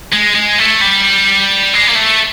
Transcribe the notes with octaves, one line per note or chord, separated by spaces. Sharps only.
G#3
G#3
A3
G3
G#3
A#3
A3